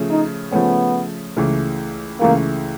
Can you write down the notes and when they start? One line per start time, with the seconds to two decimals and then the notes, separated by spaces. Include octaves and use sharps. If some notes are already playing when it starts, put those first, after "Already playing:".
Already playing: C#3 F3 A3 C#4
0.10 D#4
0.52 C#3 F3 A3 B3 C#4
1.37 C#2 C#3 E3 A3
2.20 C#2 C#3 E3 A3 A#3